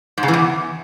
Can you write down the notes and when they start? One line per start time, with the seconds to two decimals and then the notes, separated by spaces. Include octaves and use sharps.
0.18 G#2
0.23 C#3
0.28 E3
0.34 E2